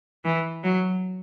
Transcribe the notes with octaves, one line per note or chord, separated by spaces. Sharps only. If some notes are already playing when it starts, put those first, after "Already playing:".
E3
F#3